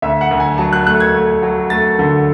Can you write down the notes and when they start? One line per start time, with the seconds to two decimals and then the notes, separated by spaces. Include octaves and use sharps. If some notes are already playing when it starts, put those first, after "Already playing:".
0.02 D2 E5
0.21 F#5
0.31 D2
0.40 G#5
0.58 F#3 A5
0.73 F#6
0.87 A3 F#6
1.00 G#6
1.14 A3
1.43 F#3
1.70 A3 A6
1.99 D3